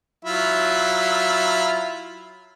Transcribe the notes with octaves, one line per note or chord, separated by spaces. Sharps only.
F#3 E4 F4